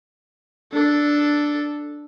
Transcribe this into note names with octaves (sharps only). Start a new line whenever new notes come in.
D4 A4